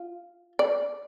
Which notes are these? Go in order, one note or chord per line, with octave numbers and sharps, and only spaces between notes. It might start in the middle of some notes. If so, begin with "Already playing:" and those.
Already playing: F4
D5